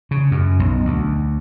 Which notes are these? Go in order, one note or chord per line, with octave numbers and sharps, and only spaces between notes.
C#3
F#2
B1
D2